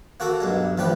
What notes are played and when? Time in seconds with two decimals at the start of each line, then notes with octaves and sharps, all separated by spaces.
0.20 A#3 F#4 A4 A#4
0.40 B1 G2 G#3
0.78 A1 F3 G3 G4 B4